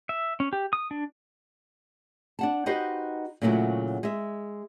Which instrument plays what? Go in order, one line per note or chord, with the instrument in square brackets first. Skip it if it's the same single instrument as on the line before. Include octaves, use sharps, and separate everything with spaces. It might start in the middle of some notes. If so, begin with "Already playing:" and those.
[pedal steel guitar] E5
C#4
G4
D#6
D4
[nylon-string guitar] D4 F#5 A5
D#4 F#4 G4 B4 C5 D#5
A#2 C#3 F#3 A3 E4 F#4
G#3 E5